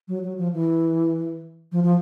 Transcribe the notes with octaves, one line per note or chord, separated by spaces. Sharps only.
F#3
F#3
F3
E3
F3
F3